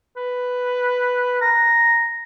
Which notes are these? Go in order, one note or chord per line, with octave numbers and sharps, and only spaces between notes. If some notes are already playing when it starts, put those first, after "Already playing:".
B4
A#5